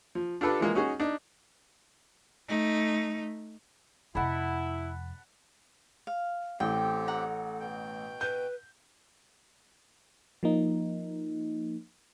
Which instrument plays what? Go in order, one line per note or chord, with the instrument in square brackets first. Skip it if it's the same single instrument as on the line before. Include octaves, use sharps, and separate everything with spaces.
[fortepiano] F3
D4 F4 G4 A4 B4 D5
E3 F3 G#3 A#3
C#4 D#4 F#4 G#4
D4 D#4
[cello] A3 D#4
[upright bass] F2 C3 [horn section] E4 [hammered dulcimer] F#5 A5 B5
[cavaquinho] F5
[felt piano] A1 [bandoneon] C4 G4 [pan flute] A4 [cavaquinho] G5
[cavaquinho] F#5 A#5
[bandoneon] B2 G5
[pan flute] B4 [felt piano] G6
[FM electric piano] F3 A#3 D#4